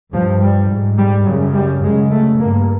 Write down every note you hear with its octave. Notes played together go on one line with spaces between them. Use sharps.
G2 F3
G3
G#2
G3
F#2 C#3 F#3
G3
F#2 C#3 G#3
A3
G2 A#3